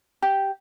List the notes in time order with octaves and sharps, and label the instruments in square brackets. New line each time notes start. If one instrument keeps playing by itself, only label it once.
[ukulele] G4